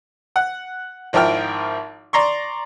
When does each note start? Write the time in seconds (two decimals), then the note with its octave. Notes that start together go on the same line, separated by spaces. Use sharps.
0.36 F#5
1.13 G#1 F3 E4 A#4 G5 F6
2.13 D5 A#5 C6 C#6